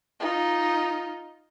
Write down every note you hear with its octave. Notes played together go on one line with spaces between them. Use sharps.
D#4 F4